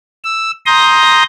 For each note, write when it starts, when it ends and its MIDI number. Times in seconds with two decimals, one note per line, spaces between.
0.24 0.51 88
0.66 1.23 82
0.66 1.23 84
0.66 1.23 87
0.66 1.23 91
0.66 1.23 94